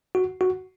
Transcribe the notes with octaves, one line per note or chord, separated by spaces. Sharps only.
F#4
F#4